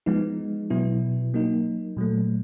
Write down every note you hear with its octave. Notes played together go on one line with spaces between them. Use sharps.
F3 G#3 B3 D#4
B2 F#3 B3 E4
F#3 A#3 D#4
A#2 F#3 A3